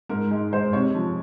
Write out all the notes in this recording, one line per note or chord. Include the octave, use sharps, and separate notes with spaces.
G#2 A#4
G#3
G#3 C5
C3 C#5
F3